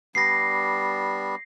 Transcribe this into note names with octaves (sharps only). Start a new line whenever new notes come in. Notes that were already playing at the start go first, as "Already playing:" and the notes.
G3 B3 D4 A#6 C7